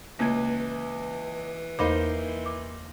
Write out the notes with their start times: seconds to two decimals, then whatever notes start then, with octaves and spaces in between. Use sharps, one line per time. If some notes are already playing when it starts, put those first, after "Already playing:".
0.19 C#2 E3 A#3 G#6
1.79 E2 A#3 D#4 C5 B5 D6
2.46 D6